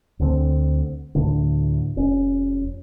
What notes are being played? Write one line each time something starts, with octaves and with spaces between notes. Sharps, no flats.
D2 D3 E3 C4
D2 A2 D3
F1 C#4